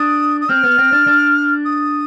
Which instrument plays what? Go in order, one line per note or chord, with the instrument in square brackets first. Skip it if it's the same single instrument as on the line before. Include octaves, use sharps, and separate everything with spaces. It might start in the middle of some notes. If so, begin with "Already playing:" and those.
Already playing: [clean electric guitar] D4 [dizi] D#6
[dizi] D#6
[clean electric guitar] C4 [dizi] F6
[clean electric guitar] B3
C4
D4
D4
[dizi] D#6